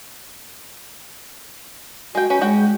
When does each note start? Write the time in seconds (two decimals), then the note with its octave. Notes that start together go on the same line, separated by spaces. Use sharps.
2.15 G#3 F#4 G5
2.30 C#4 B4
2.41 G#3 F#4 F#5 G5